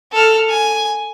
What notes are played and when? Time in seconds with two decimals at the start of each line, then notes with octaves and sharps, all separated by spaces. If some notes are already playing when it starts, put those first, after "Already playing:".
0.12 A4 F6
0.50 G#5